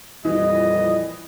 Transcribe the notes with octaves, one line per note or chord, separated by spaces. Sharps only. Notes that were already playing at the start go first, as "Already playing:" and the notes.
F2 A#2 E3 G3 D#5